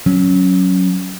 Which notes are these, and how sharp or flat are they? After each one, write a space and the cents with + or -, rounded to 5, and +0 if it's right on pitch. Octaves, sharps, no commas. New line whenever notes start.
F#3 +0 C#4 +0